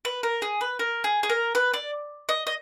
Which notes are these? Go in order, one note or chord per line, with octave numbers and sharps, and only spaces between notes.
B4
A#4
G#4
B4
A#4
G#4
G#4
A#4
B4
D5
D#5
D#5